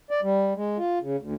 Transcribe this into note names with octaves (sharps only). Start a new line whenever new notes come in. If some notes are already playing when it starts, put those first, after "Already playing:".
D5
G3
G#3
F4
C#3
D2